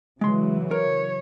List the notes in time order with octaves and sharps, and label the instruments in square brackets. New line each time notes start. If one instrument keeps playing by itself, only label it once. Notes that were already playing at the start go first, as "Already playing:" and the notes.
[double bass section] C#3 E3 F#3 [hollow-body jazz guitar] G#3 C6
[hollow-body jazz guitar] A#4 [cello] C#5